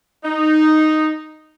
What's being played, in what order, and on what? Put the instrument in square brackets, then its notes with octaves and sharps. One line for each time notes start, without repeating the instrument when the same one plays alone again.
[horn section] D#4